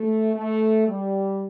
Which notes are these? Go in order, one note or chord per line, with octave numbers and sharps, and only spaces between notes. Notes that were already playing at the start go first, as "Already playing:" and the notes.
Already playing: A3
A3
G3